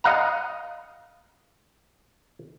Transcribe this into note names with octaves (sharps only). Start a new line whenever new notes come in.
D#5 F5 F#5 A#5